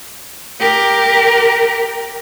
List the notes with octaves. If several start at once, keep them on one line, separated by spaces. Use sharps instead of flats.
G4 A#4